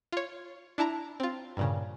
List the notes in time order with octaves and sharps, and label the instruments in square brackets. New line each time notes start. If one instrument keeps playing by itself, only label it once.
[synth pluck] F4 C#5
D4 E4 A5 A#5
C4 F4
G2 A#2 C#3